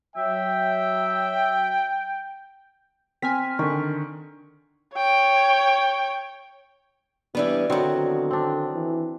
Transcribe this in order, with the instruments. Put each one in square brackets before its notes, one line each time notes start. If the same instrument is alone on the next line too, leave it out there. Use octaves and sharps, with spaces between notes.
[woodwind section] F#3 E5 [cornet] G5
[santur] C4 [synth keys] G#5 F6 B6
[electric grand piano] D3 D#3 [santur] C#6
[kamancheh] C#5 G5
[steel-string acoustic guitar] E3 G3 B3 [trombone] D4 [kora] E4 B4
[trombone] D3 [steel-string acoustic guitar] D#3 F#3 [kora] B3 C4 F#4
[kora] C4 D4
[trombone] E3